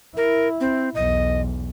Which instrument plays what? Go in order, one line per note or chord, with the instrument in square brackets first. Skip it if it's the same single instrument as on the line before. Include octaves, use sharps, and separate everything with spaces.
[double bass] E4 [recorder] A#4
[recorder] C4
[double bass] B1 E2 [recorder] D#5